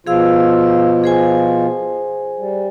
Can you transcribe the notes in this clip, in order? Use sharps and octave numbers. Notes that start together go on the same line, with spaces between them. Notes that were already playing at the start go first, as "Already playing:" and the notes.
B2 F3 F4 G#4 F5 E6
G#4 C5 G#5
G3